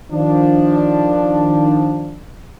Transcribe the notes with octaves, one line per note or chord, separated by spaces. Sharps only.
D#3 F3 D4